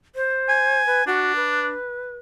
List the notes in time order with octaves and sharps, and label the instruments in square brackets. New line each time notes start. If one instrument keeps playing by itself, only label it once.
[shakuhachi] C5
[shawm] G#5
[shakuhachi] B4
[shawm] D4 [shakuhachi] F#4
[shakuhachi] B4